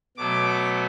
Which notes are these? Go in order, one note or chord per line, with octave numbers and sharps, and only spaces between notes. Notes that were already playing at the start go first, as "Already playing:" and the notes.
B2 F#3 A3 D6